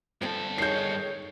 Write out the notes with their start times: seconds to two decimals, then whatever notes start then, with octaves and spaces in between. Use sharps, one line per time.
0.22 G2 F3 C4 A4
0.58 D#3 G#3 C#5 G6 C7